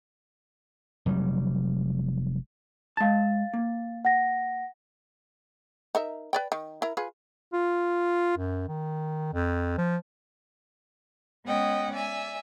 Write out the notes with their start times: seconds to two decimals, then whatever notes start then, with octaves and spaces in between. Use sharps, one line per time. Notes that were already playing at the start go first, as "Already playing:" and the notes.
1.06 F1 F#3 G3
2.97 G#3 F5 A5 A6
3.54 A#3
4.05 F#5 A#6
5.95 D#4 A#4 E5
6.33 B4 D5 G5
6.52 D#3
6.82 E4 A#4
6.97 F4 G#4 B4
7.53 F4
8.38 F#2
8.68 D#3
9.33 F2
9.78 F3
11.45 G#3 B3 C#4 D#5 F#5 G5
11.93 D5 E5 G#5